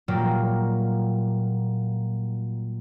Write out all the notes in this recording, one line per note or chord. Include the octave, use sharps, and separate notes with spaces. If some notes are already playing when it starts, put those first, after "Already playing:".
A#2 F#3 G3 A#3